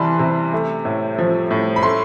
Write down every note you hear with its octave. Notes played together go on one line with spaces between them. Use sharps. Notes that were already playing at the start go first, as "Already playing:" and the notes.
Already playing: C3 E3 G3 B4 D5 A5 B5 C6
C3
A3
A2
F3
A2
B5
A3 C6